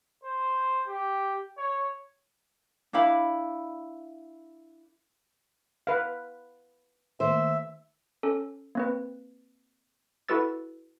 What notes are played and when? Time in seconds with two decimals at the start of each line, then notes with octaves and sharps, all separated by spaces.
0.24 C5
0.88 G4
1.58 C#5
2.93 D4 E4 F5 B5
5.87 B4 F5
7.20 D#3 A3 A#3 C5 E5
8.23 C#4 A4
8.75 A#3 C4 B4
10.29 E4 F#4 A4 B4 E6 A6